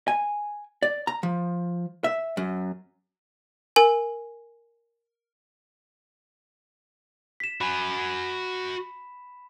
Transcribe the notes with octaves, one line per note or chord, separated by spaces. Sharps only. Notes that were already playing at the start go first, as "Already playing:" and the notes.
G#5
D5
A#5
F3
E5
F#2
A#4 G#5
B6 E7
F#4 G#5 B5